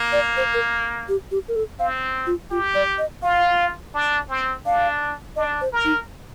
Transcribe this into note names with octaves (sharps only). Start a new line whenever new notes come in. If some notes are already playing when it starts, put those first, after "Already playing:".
Already playing: A#3
D5
C5
A#4
G4
G4
A#4
A4
C4 F5
F4
F4 G4
D5
D#5
F4 F5
D4
C4
D4 F5
D4 D#5
C5
A#4
D#4